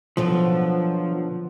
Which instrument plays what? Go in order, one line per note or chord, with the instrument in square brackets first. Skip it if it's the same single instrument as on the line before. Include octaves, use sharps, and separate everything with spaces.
[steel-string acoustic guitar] B2 D3 F#3 [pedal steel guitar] F3